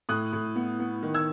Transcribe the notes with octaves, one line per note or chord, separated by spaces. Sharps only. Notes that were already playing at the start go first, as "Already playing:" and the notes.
A2 D#6 F#6
A2
B3
B3
D#3
E6 G#6